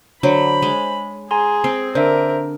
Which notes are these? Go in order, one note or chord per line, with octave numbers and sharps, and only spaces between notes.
D3 F#3 C5 B5
G#3
G#4 G#5 A#5 C6
C4 C7
D3 A#4 C5 E5